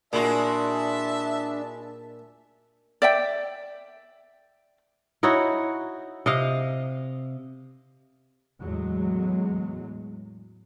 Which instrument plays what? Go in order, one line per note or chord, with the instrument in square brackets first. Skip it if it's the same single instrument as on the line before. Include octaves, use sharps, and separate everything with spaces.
[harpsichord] A#2 [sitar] G#3 E4 F#4 [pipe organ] D4 [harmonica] E5 A5
[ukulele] D5 E5 G5
[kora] D#4 E4 F#4 C#5
C3 D#5 F5
[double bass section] E2 A2 F#3 G#3